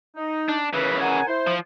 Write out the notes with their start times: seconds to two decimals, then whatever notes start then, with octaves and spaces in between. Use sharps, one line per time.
0.16 D#4
0.49 D4
0.73 D#2 C#3 E3 A#4 B4
1.00 A#4 F#5 G#5
1.27 E4 C5
1.47 F3